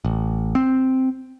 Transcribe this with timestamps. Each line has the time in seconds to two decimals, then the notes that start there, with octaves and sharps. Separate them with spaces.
0.05 A1
0.55 C4